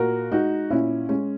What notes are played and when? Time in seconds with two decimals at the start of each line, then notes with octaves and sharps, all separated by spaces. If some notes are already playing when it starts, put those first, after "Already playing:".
Already playing: A#2 F#4 A#4
0.31 G#3 D#4 F#4
0.70 A#2 C#4 E4
1.09 G#3 C#4